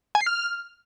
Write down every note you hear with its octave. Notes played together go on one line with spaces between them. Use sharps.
G#5
C7
F6